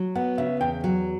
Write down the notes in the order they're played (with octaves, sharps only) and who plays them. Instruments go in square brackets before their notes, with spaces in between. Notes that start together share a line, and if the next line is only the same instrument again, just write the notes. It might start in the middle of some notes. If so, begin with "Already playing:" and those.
Already playing: [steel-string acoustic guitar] F#3
[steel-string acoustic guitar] B3 [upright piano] F#5
[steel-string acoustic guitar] C#3 [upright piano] E5
[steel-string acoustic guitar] E2 [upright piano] G5
[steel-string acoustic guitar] F#3